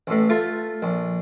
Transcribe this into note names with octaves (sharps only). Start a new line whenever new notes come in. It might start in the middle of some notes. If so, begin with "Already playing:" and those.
A1 A2
A3 F4
A#1